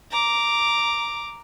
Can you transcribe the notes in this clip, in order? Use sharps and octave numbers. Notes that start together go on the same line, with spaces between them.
A#5 D6